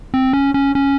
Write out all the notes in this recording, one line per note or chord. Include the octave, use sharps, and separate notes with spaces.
C4
C#4
C#4
C#4